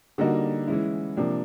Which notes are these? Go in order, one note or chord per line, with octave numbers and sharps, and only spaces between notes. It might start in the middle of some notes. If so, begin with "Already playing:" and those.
D3 G3 A#3 D#4 F#4
E3 G#3 C#4 E4
C3 F3 A#3 D4